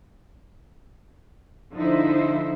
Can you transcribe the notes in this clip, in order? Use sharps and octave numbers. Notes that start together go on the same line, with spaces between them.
D3 F3 D#4 E4 C5